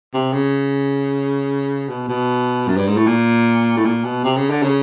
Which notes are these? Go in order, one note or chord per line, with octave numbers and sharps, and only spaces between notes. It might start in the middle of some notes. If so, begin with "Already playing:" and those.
C3
C#3
B2
B2
F#2
G2
G#2
A2
A#2
A2
A#2
B2
C3
C#3
D3
C#3